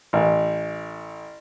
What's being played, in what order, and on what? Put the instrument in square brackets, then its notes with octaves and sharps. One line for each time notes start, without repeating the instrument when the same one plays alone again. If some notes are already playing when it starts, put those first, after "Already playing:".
[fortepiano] A1